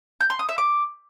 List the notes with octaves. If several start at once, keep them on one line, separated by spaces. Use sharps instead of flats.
G6
C6
D#6
E5
D6